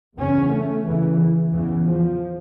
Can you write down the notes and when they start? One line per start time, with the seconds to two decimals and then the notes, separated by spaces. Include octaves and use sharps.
0.19 E2 C#3 C#4
0.52 A3
0.86 E2 C#3 E3
1.52 E2 C#3 E3
1.85 F3